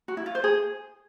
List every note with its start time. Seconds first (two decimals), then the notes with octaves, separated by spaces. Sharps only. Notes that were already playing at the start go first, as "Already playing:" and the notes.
0.08 F#4
0.17 E4
0.26 F4
0.35 C5
0.44 G#4